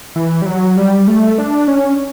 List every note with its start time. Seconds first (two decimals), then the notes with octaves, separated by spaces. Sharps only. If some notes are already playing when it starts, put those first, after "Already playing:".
0.16 E3
0.42 G3
0.46 F#3
0.77 G3
1.08 A3
1.38 D4
1.68 C#4